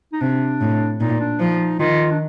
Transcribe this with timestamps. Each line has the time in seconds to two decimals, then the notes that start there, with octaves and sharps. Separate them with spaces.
0.13 D#4
0.21 C3 D4
0.61 A2
1.00 A#2 D#4
1.20 D4
1.40 F3 D#4
1.80 D#3 F4
2.11 D4